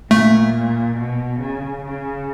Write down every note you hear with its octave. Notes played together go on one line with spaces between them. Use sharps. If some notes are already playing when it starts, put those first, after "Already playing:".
A#2 A3
B2
C#3
C#3